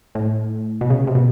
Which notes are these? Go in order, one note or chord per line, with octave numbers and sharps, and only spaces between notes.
A2
B2
C#3
C3
B2